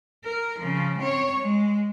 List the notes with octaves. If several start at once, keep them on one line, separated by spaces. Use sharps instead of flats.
A#4
C#3 F3
C4 C#5
G#3